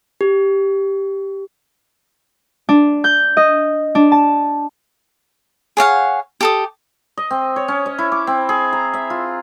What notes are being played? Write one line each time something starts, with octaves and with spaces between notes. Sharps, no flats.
G4
D4
G6
D#5
D4
A5
G#4 C#5 F5 F#5
G4 A4 D#6
D#5
C4
C#5
C#4
D#5
E4
D6
C4
G#4
A#5
E5
F4